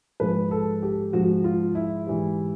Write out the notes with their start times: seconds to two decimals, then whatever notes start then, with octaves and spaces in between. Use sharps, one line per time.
0.20 G#2 F3 G#3 B4
0.51 A4
0.83 G4
1.13 G#2 F3 G#3 F#4
1.44 F4
1.75 E4
2.07 G#2 E3 G3